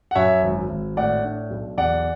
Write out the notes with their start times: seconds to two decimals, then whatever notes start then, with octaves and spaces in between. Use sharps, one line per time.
0.11 F#5
0.15 F#2 C#5 E5
0.43 G#1
0.69 G#1
0.97 A2 D5 F#5
1.24 D4
1.50 B1
1.77 E2 D5 F#5